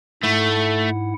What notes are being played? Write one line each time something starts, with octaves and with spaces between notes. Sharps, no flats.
G#2 A3 E4 F#5